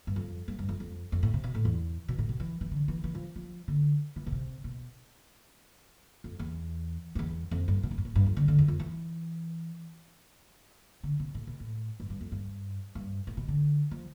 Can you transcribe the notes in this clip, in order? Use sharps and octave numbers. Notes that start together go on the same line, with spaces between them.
G2
F2
G2
G2
F2
F2
F2
A2
C3
B2
A2
E2
B2
A2
B2
E3
E3
D3
E3
E3
F3
F3
D3
E3
D3
C3
B2
F2
E2
F2
E2
F2
G2
B2
A2
G2
A2
G2
F2
D3
D3
E2
F2
E3
D3
C3
A2
B2
A2
G2
G2
F2
G2
G2
A2
B2
D3
F3